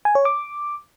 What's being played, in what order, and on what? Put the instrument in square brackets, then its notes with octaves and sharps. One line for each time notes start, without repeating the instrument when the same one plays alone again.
[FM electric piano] G#5
C#5
D6